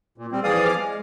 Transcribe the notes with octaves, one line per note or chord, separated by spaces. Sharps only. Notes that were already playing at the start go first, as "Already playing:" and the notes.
A#2
G3 C4
E3 F3 G#4 D5 F5 D#6
G#4 D6 F6
G#3